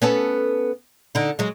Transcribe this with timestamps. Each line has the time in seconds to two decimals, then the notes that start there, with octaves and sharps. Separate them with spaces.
0.02 B3 C#4 A4
1.15 D3 D#4
1.39 F#3 G#3